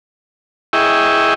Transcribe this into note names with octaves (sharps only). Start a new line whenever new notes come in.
E4 G#4 D#5 E5 G5 C#6